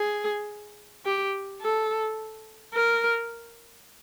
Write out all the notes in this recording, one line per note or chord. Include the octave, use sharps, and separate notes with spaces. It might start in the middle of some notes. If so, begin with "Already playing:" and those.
Already playing: G#4
G4
A4
A#4